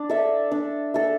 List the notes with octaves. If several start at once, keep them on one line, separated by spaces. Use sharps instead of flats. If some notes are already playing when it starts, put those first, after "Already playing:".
Already playing: D4
A4 E5
D4
A4 E5